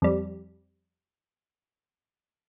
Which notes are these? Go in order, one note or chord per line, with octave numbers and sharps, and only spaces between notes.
F2 G3